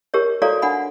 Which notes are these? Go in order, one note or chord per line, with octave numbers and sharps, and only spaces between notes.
G4 A#4 C#5
F#4 A4 C#5 D5 F5 A#5
D4 F#5 G#5 B5